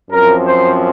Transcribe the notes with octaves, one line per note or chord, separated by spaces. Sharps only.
F#2 F3 C4 A#4
C5